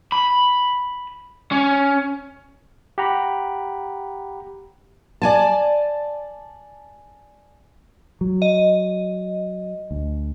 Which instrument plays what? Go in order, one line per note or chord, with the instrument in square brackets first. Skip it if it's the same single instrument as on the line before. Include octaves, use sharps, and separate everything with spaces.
[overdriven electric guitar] B5
C#4
[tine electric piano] G4 F#5 A#5 B5
[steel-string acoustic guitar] D5 G#5 A5
[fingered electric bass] F#3
[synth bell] D#5
[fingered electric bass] D2